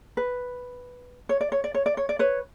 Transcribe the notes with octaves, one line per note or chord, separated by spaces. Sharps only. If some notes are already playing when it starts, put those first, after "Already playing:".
B4
C#5
D5
C#5
D5
C#5
D5
C#5
D5
B4 C#5